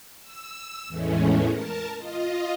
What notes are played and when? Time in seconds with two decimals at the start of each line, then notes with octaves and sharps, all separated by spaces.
0.20 E6
0.88 E2 A2 E3 G#3 A3 C#4
1.51 A#4 A5
1.97 F4 D#5